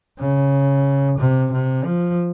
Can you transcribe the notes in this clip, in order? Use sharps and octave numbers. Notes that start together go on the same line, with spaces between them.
C#3
C3
C3
F3